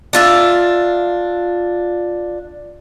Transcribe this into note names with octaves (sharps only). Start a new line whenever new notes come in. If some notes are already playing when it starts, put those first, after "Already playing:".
D4 F4 E5